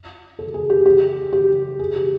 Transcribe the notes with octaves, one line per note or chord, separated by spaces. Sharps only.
A4
G#4
G4
G4
G4
G#4
G4